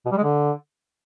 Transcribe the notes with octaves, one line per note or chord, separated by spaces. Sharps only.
B2
G3
G#3
D3